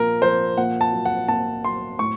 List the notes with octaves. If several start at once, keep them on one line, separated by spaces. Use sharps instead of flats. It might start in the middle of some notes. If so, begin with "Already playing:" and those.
Already playing: A#2 F3 A#4
F3 C5
A#2 F#5
A5
F#3
F#5
A#2 A5
F#3 C6
A2 C#6